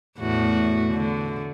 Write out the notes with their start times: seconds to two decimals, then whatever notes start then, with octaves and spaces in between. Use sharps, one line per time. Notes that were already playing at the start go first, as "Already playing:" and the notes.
0.19 E2 A2 F#4
0.94 D3